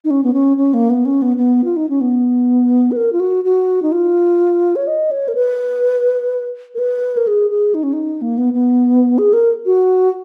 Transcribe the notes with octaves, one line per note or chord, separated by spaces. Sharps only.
D#4
C#4
B3
C#4
C#4
A#3
B3
C#4
B3
B3
F4
D#4
C#4
B3
B4
A#4
F4
F#4
F#4
D#4
F4
C#5
D#5
C#5
A#4
B4
A#4
B4
A#4
G#4
G#4
D#4
C#4
D#4
A#3
B3
B3
G#4
A#4
F#4